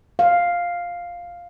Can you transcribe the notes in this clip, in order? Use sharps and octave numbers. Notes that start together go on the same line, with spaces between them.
F5